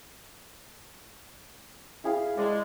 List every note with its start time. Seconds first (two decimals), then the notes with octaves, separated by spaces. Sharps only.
2.04 E4 G#4 F5
2.37 G#3 D5 G#5 A5